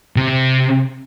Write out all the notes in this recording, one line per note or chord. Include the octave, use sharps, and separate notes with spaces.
C3